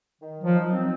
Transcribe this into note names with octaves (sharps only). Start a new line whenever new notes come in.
D#3
F#3
F3
D#4
C4